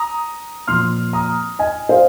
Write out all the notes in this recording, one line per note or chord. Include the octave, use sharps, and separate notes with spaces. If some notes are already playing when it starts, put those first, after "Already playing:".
Already playing: A#5 D#6
A#2 F3 C4 C6 F6
A#5 D#6
D#5 G#5
C5 F5